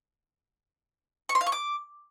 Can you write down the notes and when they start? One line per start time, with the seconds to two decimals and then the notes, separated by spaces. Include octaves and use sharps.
1.29 C#6
1.35 C6
1.41 F5
1.46 C#6
1.52 D6